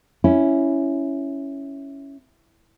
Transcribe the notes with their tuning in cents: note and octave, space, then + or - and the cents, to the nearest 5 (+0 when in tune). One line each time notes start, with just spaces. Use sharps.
C#4 +0 E4 +0